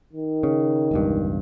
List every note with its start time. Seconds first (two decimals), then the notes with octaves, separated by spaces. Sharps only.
0.13 D#3
0.43 C#3
0.91 E1 C#2 G2